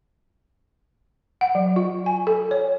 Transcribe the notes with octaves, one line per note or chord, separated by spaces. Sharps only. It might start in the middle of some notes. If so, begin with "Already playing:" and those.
F#5
F#3
F4
G#5
A4
C#5